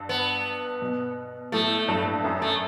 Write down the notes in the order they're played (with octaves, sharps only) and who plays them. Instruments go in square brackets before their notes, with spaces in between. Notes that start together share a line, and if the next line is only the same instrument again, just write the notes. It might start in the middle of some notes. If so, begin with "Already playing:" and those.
Already playing: [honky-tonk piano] G2
[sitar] B3
[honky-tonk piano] B2
[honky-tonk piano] A2 [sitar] A3
[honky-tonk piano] G2
F#2
[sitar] A3